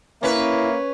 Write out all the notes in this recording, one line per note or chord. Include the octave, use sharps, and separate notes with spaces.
A#3 C#4 E4 B4